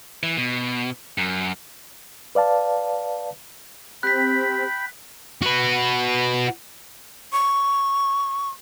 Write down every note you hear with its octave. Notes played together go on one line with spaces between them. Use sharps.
E3
B2
F#2
B4 D5 F5 A5
C4 G4 G5 B5 F#6 B6
F#4 B4
C#6